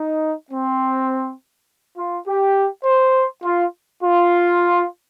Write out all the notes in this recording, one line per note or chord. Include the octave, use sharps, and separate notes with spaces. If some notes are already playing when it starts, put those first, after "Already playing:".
Already playing: D#4
C4
F4
G4
C5
F4
F4